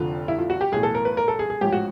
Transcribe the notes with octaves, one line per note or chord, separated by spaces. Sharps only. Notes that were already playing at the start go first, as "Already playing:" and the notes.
Already playing: F1 F2 D3 F3 F4
E4
F4
F#4
G4
B1 A2 E3 G#4
A4
A#4
B4
A#4
A4
G#4
G#4
A1 G#2 F3 G4
F#4